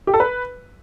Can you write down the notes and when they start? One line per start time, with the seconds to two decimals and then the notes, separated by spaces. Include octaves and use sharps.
0.07 G4
0.14 A4
0.20 B4